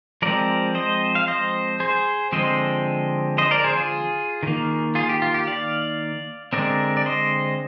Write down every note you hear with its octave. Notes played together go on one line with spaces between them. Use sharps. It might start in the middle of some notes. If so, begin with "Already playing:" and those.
F3 G#3 C4 A#4 D5
C5 D#5
F5
C5 D#5
G#4 C5
D3 F3 G#3 C4 C5 D#5
C5 D#5
A#4 D5
G#4 C5
F4 G#4
D#3 A#3
F4 G#4
G4
F4
G4
D5 F5
D3 G#3 C4 A#4 D5
D5
C5 D#5